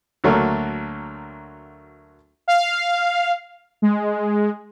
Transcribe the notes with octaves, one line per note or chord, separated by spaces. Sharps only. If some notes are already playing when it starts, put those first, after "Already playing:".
D2 F#3 A3 A#3
F5
G#3